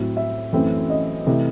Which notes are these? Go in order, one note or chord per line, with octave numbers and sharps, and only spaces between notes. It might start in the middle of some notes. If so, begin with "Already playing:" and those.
Already playing: A2 F#3 C4 E4
E5
F#2 E3 A3 C4 E4
D#5
C3 E3 A3 E4